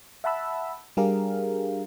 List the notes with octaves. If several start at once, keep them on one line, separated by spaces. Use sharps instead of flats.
E5 F#5 A5 B5 E6
G3 D4 G4 G#4 A#4 F5